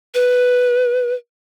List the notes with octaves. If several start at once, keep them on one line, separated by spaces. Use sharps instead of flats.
B4